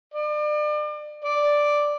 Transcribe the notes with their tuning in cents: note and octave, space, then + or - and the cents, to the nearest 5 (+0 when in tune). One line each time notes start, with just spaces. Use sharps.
D5 +35
D5 +0